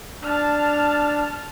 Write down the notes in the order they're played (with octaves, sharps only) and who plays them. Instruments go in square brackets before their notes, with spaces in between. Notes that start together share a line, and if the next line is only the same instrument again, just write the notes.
[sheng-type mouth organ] D4 [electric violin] A5 F6